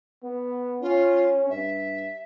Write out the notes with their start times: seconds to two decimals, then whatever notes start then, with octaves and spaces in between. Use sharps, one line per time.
0.24 B3
0.82 C#4 F4
1.50 G2 E5